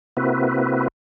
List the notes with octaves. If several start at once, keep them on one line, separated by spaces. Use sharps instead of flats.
C3 A#3 C4 E4 F#4 B4